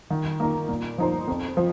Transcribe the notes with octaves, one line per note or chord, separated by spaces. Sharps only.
D#3
A#3 D#4 A#4
A#2
F3 D#4 C5
F2
F3